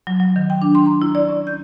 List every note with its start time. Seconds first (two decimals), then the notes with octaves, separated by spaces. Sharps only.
0.07 F#3
0.20 F#3
0.36 D#3
0.50 G5
0.62 D4
0.75 C6
0.86 A#5
1.02 E4
1.15 D5
1.29 C#4
1.47 G6